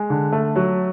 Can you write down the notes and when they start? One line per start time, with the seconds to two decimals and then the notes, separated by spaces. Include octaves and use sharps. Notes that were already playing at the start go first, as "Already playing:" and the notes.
Already playing: G#3
0.10 D3
0.32 A3
0.56 F#3